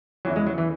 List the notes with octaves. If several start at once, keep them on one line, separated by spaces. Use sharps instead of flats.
E2 C#3 E3 F#3 B3 E4
G#3
F#3
E3